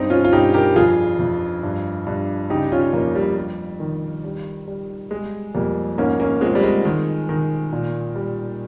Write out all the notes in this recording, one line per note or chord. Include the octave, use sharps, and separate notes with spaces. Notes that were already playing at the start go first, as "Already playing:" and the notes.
Already playing: G2 C4 D#4
C#4 F4
F4
G2 D#4 G4
G4 A#4
F2 F4 G#4
F2
G2
G2
C#3 D#4 G4
C#4 F4
F2 A#3 C#4
G3
G3
D#3
G3
G3
G3 G#3
F2 G3 A#3
G#2 A#3 C#4
A#3 C#4
F3 G#3 C4
G3
G#3
D#3 G#3
D#3
A#2
G3